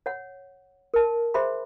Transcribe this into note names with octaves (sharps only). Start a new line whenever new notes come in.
C#5 F#5
A#4 A5
G#4 C5 E5 B5 C6